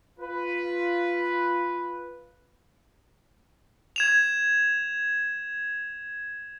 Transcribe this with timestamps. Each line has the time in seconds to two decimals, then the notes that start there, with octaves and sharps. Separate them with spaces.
0.19 F4 B4
3.96 G#6 E7 F7